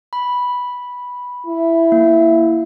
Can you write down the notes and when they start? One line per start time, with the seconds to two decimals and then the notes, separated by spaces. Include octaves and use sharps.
0.13 B5
1.46 E4
1.92 A#3